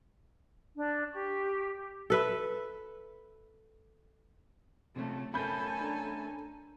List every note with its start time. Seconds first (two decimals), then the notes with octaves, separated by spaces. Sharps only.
0.76 D4
1.12 G4 C#6
2.10 A4 B4 E5
4.96 C3 F3 A3 C#4
5.34 A3 C#4 A4 A#4 G#5 B5 G6
5.81 D4 A#5